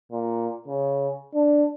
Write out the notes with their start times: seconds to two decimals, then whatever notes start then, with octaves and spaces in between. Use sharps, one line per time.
0.12 A#2
0.68 C#3
1.35 D4